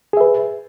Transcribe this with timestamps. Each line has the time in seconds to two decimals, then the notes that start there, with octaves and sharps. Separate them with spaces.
0.13 G#4
0.17 E5
0.21 B4